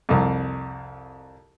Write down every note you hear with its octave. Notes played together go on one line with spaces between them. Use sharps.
C2 F2